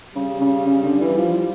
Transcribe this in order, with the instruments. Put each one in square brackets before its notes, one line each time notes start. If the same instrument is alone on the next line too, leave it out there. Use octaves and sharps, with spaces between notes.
[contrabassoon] C#3 [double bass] G3
[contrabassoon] C#3
C#3
D3
E3
F3